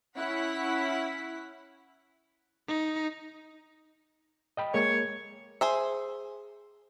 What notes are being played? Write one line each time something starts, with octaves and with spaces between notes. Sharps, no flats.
C#4 E4 F#5 B6
D#4
D#5 G5 B5
G#3 A#3 C#5
G#4 C5 E5